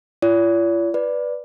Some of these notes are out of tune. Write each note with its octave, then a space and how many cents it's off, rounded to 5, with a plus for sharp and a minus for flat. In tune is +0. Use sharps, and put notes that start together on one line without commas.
F4 -45 D5 -45
B4 +0 D5 +0